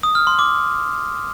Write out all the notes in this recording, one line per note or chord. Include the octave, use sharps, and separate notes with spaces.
D#6
F6
C6
D6